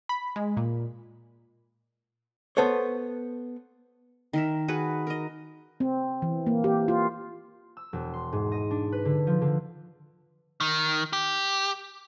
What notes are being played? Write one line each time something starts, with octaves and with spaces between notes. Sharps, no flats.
B5
G#3
A#2
B3 A4 C5 C#5
D#3 A#4 E5
F#4 G#4 B4
A#4 D#5
C4
E3
A#3
G4
F4
E6
E1
C6
G#2
D#5
D4
B4
D3
F3
D3
D#3
G4